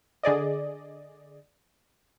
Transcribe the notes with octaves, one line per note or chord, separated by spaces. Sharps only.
D3 G#4 D5 D#5